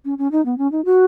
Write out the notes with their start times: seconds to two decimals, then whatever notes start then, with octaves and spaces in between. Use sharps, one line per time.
0.05 C#4
0.18 C#4
0.32 D#4
0.45 B3
0.58 C#4
0.72 D#4
0.85 F#4